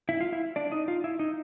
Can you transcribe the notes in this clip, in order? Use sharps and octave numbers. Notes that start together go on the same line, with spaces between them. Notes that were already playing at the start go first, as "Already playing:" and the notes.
E4 E5
F4 F5
E4 E5
D4 D5
D#4 D#5
F4 F5
E4 E5
D#4 D#5